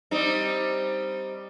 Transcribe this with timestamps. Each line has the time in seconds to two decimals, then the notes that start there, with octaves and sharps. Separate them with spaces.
0.11 G3 C4 D#4